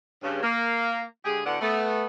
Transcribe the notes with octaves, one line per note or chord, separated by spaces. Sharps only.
G2 C#3
A#3
D3 G#3 G4 G#4
D2 A2 D3 B3 D5 F#5
A3 B3